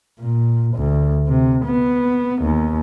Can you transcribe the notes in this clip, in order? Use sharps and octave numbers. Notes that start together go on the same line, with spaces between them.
A#2
D2
C3
B3
D#2